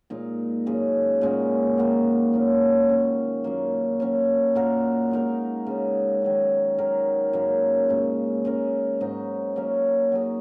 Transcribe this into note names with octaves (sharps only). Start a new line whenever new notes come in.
A#2 G#3 D#4
F#2 C#3 G#3
A#2 G#3 C#4 F#4
D#3 A#3 F#4 A#4
C#3 F#3 A#3 C#4
D#3 A#3 C#4
F#2 F#3 A#3
F#3 C#4 A#4 C#5
A#2 A#3 F#4 A#4
G#3 D#4 A#4
C#3 G#3 D#4
D#3 F#3 C#4
D#3 F#3 D#4 A#4
F#2 C#3 A#3
A#2 G#3 C#4
G#3 C#4 A#4
G#2 F#3 D#4 F#4
F#3 A#3 C#4 A#4
F#3 D#4 G#4